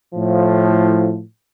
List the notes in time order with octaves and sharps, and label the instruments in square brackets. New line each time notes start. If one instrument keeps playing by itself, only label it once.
[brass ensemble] A2 F3